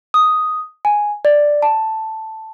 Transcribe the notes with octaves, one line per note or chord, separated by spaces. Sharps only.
D#6
G#5
D5
A5